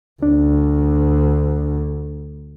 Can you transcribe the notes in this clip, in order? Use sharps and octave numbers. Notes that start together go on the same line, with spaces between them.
D2 D4